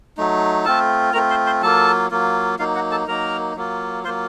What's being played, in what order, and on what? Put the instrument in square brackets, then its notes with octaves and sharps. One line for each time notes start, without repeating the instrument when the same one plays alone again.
[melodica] F#3 A3 D#4
A3 C4 F4 A4 A5
A3 C4 F4 A#4 A#5
C5 C6
C5 C6
F#3 A#3 F4 A4 A5
F#3 A#3 F4
F#3 A#3 D#4 F4 F5
F#4 F#5
A4 A5
F#3 A#3 D#4 A#4 A#5
F#3 A#3 F4
F#3 A#3 F4 C5 C6